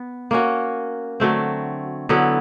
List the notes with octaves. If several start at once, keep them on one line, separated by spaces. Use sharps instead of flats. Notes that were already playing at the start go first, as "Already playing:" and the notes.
Already playing: B3
A#3 C#4 F#4
D3 F#3 A3 C4
D3 F#3 B3 E4